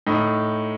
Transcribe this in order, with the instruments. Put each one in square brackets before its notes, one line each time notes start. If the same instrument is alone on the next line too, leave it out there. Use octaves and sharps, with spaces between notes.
[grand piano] A2 D#4